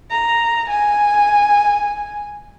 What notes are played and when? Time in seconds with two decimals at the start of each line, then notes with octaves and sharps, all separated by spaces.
0.11 A#5
0.70 G#5